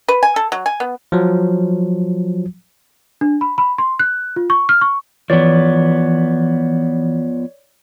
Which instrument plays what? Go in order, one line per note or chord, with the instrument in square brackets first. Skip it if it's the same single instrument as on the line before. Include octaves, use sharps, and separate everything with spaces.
[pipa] B4
G#5
A4
F#3
G#5
B3
[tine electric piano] F3 F#3
[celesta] D4
B5
B5
C6
F#6
F4
C#6
F6
C#6
[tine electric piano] E3 [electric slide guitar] F3 B3 [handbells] C#5 D5